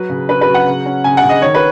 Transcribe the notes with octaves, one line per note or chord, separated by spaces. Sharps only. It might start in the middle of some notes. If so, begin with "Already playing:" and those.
Already playing: F#3 B4
C#3
C#4 B4
B4
F#3
F#5
C#3
C#4
C#3 G#5
F#5
C#3
D#5
D#3 C#5
B4